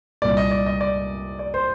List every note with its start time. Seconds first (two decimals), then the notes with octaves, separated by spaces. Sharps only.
0.22 C2 A#2 G3 D5
0.37 D#5
0.51 D5
0.66 D#5
0.81 D5
1.39 D5
1.54 C5